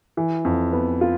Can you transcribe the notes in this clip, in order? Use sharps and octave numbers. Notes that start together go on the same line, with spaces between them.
E3
F2
B3
F4